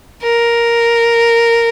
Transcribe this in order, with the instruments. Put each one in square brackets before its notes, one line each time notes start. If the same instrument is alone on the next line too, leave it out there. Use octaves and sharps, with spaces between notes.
[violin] A#4